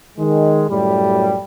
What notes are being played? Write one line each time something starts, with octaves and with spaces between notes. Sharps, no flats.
D#3 G#3
F#2 A2 G3